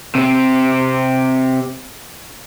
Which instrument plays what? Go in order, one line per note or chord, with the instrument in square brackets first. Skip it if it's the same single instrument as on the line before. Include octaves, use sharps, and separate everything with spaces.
[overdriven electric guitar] C3 C4